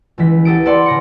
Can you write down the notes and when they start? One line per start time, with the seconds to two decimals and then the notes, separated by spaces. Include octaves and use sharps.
0.18 C#2 E3 B6
0.45 F#4 G4 A4 D#6 D7
0.66 A4 B4 D5 F#5 C6
0.86 C#3 A#6 C#7